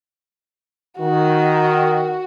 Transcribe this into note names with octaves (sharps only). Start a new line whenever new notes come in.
D#3 F#4